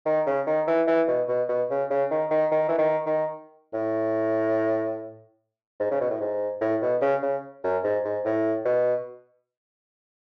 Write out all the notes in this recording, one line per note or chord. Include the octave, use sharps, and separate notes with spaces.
D#3
C#3
D#3
E3
E3
B2
B2
B2
C#3
C#3
D#3
D#3
D#3
E3
D#3
D#3
A2
G#2
C#3
B2
A2
G#2
A2
B2
C#3
C#3
F#2
G#2
G#2
A2
B2